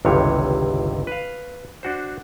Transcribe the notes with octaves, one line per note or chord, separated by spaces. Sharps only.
G1 C#2 C3 D#3 E3 C#5
B4 F5
D4 F#4 C5